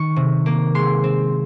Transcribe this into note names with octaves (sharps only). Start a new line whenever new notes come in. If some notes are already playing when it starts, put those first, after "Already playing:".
Already playing: D#3 C#6
C3
A#3
G#3 C6
C4